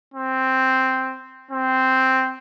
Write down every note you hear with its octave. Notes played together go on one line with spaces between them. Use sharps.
C4
C4